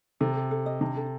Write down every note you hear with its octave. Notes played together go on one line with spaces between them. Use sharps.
C3 A4
A4
A4
D#5
C3 D4
A4